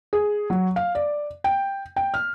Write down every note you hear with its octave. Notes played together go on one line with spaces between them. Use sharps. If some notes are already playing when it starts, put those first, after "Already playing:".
G#4
F#3
F5
D5
G5
G5
F6